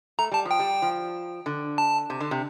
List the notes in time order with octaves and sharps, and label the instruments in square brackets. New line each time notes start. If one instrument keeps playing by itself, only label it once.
[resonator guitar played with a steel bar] A3 [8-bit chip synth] A#5
[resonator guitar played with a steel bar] G3 [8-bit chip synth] A5
[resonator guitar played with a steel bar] F3
[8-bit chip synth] G5
[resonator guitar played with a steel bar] G3
F3
D3
[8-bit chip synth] A5
[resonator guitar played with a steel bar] C3
D3
C3